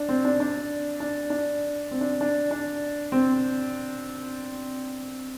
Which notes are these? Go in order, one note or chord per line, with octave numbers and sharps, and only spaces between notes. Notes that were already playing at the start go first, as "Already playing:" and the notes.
Already playing: D4
C4
D4
D4
D4
D4
C4
D4
D4
D4
C4